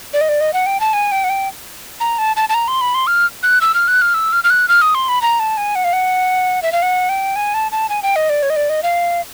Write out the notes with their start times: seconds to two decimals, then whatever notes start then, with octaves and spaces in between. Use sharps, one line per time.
0.13 D5
0.21 D#5
0.29 D5
0.41 D#5
0.53 F#5
0.66 G5
0.80 A5
0.93 G#5
1.12 G5
1.24 F#5
1.30 G5
2.00 A#5
2.18 A5
2.36 A5
2.49 A5
2.54 A#5
2.68 C6
2.81 B5
2.95 C6
3.07 F6
3.43 F#6
3.61 E6
3.74 F6
3.88 F#6
4.02 F6
4.14 E6
4.33 F6
4.44 F6
4.50 F#6
4.68 F6
4.82 D#6
4.95 C6
5.09 B5
5.22 A#5
5.40 A5
5.57 G#5
5.75 F#5
5.84 F5
5.93 F#5
6.62 E5
6.72 F5
6.82 F#5
7.09 G5
7.36 G#5
7.54 A5
7.72 A5
7.89 G#5
8.03 G5
8.16 D#5
8.29 D5
8.43 C#5
8.50 D#5
8.56 D5
8.70 D#5
8.83 F5